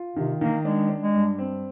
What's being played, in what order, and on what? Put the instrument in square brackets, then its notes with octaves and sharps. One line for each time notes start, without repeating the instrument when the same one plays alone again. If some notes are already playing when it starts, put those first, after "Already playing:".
Already playing: [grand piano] F4
[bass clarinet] C3 [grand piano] D#3
[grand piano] D#3 [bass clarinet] A#3
[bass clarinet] G#3 [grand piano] D4
[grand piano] D4
[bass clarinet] G#3
[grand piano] G2
C4